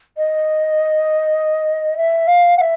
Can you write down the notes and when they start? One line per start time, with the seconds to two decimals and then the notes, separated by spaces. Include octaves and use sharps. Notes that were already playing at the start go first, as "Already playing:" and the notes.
0.17 D#5
1.97 E5
2.27 F5
2.57 F#5
2.60 E5